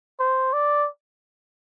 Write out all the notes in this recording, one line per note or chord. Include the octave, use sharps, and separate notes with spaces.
C5
D5